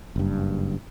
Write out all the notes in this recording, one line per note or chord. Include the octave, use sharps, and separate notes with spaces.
F#1 G2